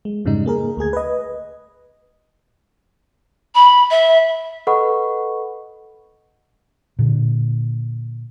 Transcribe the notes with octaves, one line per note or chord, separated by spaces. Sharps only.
G#3
F2 G#2 C#3 G3 D#4
A#3 G#4 A#4
D2 A3 G#4 G#6
B4 D#5
B5
E5
A4 B4 D#5 F#5 B5 C#6
A#2 D3